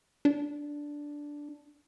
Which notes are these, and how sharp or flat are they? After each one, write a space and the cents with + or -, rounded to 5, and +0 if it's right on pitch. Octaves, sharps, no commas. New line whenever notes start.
D4 -5